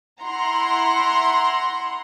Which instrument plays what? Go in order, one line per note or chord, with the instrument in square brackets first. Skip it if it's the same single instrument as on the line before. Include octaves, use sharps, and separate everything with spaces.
[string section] E4 F#5 A#5 C6